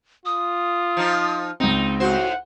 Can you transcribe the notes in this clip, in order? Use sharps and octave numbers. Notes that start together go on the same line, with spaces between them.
F4 D#6
F3 D#4
C#2 C4 D#4
A2 F#4 C5 F#5